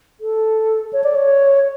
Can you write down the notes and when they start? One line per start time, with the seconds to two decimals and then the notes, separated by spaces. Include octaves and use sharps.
0.21 A4
0.93 C#5
1.04 D5
1.15 C#5